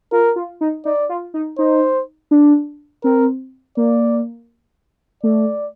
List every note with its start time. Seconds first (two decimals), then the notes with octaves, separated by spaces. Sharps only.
0.12 F4 A#4
0.36 F4
0.61 D#4
0.85 D#4 D5
1.09 F4
1.34 D#4
1.58 D#4 C5
2.31 D4
3.04 C4 A#4
3.77 A#3 D5
5.23 A3 D5